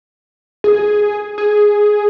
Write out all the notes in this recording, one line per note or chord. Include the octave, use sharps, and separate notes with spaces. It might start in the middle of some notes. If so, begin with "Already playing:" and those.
G#4
G#4